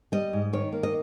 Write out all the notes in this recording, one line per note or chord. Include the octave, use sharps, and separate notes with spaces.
G3 D#5
G#2
D#3 C#5
A#3
D#5